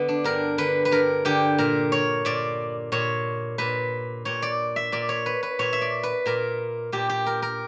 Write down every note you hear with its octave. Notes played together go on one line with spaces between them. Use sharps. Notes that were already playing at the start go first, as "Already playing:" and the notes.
Already playing: D3 B3
D4
G2 A#4
D3 B4
B4
G2 A#4
D3 G4
A#2 A#4
C#5
A#2 D5
A#2 C#5
A#2 B4
A#2 C#5
D5
E5
A#2 D5
C#5
B4
B4
A#2 C#5
E5
D5
B4
A#2 A#4
A#2 G4
G4
A#4
A#4